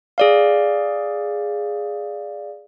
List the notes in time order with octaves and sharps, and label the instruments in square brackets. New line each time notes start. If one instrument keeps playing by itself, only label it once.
[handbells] G#4 D5 F5